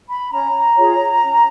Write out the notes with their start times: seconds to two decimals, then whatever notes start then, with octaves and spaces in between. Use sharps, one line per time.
0.08 B5
0.31 C#4 A#5
0.77 F4 G#4 C#5
1.24 C#4